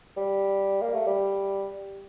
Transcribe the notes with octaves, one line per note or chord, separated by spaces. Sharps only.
G3
A#3
A3
G3